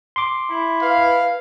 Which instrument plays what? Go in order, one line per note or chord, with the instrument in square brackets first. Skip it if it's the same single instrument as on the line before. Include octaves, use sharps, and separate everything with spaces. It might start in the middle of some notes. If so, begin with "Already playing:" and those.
[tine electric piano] C6 D6
[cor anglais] E4
[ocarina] B4 [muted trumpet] F5